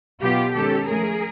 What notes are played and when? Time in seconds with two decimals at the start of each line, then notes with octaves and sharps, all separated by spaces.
0.22 B2 F#3 B3 F4 G4
0.55 D#3 G#3 C#4 G4 A4
0.88 F3 A3 C#4 G#4 A#4